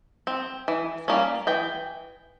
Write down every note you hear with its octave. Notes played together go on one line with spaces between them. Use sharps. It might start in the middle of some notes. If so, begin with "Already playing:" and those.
C4
E3
G3 A#3 C#4
E3 G5